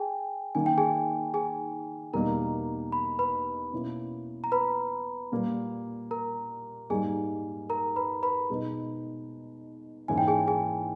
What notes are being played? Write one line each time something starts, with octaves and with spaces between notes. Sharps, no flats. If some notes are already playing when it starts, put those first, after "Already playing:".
Already playing: G#4 G5 G#5
D#3 A#3 D#4 G#5
G5
G#4 G#5
G#4 G#5
E2 B2 G3 A#3 D#4 A#4 A#5
B5
B4 B5
B2 A#3 C#4 E4
A#5
B4 B5
A#2 G3 A#3
A#4 A#5
G#2 G3 A#3 D#4 G#4 G#5
A#4 A#5
B4 B5
B4 B5
B2 G#3 D#4
G#2 E3 A#3 C#4 E4 G#5
G5
G#4 G#5
G#4 G#5